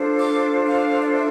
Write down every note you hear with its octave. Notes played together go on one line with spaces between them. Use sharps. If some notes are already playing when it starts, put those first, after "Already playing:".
Already playing: D4 F4 A4 C5
D6
F5
D5
E5